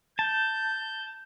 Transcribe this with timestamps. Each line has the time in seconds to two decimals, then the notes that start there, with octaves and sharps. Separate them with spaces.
0.19 A5 G6